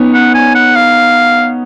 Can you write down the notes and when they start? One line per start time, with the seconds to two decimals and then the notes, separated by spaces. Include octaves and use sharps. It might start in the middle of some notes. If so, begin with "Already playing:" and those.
Already playing: B3 C#4 D#4
0.14 F#5
0.34 G#5
0.55 F#5
0.76 F5